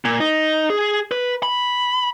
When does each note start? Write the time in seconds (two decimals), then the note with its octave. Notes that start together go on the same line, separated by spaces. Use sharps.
0.05 A#2
0.20 D#4
0.70 G#4
1.12 B4
1.43 B5